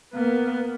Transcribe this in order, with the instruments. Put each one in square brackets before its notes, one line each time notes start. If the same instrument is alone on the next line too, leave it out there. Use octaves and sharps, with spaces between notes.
[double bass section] A#3 [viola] B3